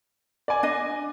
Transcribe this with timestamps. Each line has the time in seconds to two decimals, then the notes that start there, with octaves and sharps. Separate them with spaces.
0.48 D5 G#5
0.63 D4 D#5